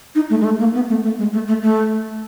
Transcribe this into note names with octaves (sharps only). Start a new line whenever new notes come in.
D#4
A3
G#3
A3
A#3
B3
A3
A3
G#3
A3
A3
A3